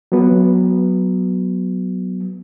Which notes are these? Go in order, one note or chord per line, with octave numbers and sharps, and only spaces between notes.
F#3 B3